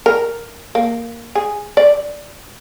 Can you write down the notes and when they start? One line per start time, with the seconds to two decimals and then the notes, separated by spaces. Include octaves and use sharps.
0.06 A#4
0.75 A#3
1.35 G#4
1.77 D5